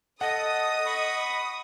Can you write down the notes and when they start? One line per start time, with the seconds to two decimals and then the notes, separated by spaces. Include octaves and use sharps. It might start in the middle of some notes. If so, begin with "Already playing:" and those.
0.21 A4 D#5 F#5 D#6
0.86 B5 C#6